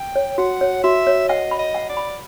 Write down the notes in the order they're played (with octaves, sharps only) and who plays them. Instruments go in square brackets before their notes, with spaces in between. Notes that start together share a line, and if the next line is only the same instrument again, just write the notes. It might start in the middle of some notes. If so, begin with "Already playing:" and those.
Already playing: [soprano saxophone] G5
[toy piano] C#5
[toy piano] F#4 [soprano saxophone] F#5
[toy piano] C#5
[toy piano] F#4 [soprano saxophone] E5
[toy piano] C#5
[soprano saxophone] D#5 [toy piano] F#5
[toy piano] B5
[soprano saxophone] D#5
[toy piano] F#5
[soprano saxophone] D5
[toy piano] B5